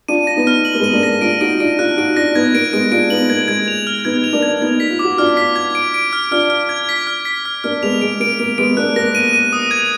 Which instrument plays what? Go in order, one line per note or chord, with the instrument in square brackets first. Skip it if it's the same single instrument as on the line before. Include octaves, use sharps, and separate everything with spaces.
[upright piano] D4 F4 [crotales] D#7
[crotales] A#6
[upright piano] B3 D#4
[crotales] F6
F#7
[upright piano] A#3
G#3 B3
[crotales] D#7
[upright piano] A#3 D4
[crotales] A#6
[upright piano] D4 F4 [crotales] D7
[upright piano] D#4 F#4 [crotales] D7
[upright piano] D4 F4 [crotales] D7
[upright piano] D4 F4 [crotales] F#6
[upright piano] D#4 F#4 [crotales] D7
[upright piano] D4 F4 [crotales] A#6
[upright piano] B3 D#4 [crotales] G#6
[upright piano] A#3 [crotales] D7
[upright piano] G#3 B3 [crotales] D7
[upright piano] D4 F4 [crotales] D7
[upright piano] B3 D#4 [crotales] F#7
[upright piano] A#3 [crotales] G#6
[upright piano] G#3 [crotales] G#6
[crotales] F7
F6
[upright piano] B3 D#4 [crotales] G#6
[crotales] F7
[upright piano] A#3 D4
[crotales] G#6
[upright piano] B3 D#4 [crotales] G#6
[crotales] B6
[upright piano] F4
[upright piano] F#4 [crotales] D6
[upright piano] D4 F4 [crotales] F6
[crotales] B6
G#6
D7
D7
F6
[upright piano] D4 F4 [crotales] F6
[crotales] F6
G#6
B6
F6
B6
F6
[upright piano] A#3 D4 [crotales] F6
[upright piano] G#3 B3 [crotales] F7
[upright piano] G#3 [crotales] D7
[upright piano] A#3 [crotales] D7
[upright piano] A#3 [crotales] D7
[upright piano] G#3 B3 [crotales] D7
[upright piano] A#3 D4 [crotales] F#6
[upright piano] A#3 [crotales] A#6
[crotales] D#7
D#7
D#6
G#6